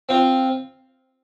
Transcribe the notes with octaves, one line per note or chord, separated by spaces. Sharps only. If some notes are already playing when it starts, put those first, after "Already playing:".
C4 F4